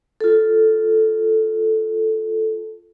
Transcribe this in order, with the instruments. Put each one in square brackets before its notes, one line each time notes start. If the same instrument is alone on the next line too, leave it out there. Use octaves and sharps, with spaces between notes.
[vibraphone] F4 A4